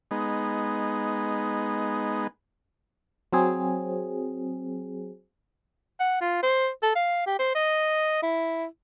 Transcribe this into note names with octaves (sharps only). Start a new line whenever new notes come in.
G#3 B3 D#4
F#3 C4 G#4
F#5
F4
C5
A4
F5
G4
C5
D#5
E4